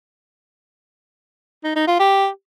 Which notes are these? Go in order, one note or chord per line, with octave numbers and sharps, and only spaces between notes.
D#4
D#4
F4
G4